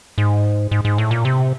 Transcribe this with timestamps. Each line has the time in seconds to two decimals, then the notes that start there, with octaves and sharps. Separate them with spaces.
0.18 G#2
0.71 G#2
0.85 G#2
0.98 A2
1.11 A#2
1.25 C3